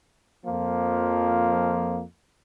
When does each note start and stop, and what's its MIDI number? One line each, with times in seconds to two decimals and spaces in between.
0.46 2.02 41
0.46 2.02 53
0.46 2.02 58